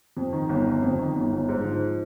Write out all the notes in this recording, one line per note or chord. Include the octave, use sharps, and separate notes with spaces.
F2
D#3
G1
G1
F2
D#3
G1
G1
G#2
F3